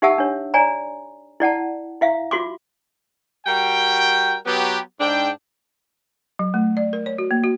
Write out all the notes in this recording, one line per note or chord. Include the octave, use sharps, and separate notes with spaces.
D#4 G4 E5 F#5 A5 E6
D4 C#5
C#5 D5 G#5 A#5
E4 D5 F#5 A5
E4 E5 F5
F4 F#4 C6 D6
G3 F#4 A#4 G5
F#3 B3 G4
G#2 D4 G5
F#3
A3
D5
A#4
C#5
F#4
A#3
F#4